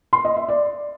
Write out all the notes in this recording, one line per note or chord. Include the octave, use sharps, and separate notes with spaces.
C6
D#5
E5
D5